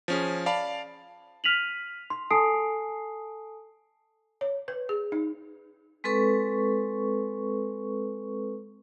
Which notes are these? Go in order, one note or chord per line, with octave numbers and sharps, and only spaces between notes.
F3 C#4 G#4
D5 F5 A5 B5
F6 B6 D#7 F7 F#7
C6
A4 G#5 A5 D#6 C7 D7
C#5
B4
G#4
D#4
G#3 C4 A4 B4 C#6